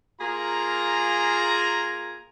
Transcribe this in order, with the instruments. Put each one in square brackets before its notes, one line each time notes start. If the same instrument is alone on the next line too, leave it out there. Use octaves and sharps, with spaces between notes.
[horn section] A#3 F4 G#4 A#4 A#5